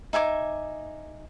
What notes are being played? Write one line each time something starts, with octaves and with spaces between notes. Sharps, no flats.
D#4 E5 G#5 D6